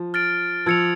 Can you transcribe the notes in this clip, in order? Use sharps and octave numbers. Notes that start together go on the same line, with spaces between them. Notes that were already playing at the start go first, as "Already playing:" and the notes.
Already playing: F3
F6 A6 D7
F3 E6 G#6 C#7 F7